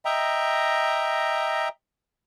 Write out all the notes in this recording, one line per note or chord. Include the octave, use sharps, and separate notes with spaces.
D#5 E5 G5 A#5